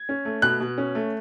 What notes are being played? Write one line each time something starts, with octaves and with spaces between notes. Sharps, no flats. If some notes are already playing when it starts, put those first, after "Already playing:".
Already playing: G#6
C#4
A3
B2 F#6
B2
C#4
A3